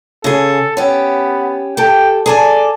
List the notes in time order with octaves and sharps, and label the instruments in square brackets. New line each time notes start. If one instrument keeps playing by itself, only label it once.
[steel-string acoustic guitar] C#3 G#4 [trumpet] A4
[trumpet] B3 [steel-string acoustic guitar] C#4 G4
[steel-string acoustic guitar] G4 A4 [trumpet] G5
[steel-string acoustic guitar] G#4 A4 G#5 [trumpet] D5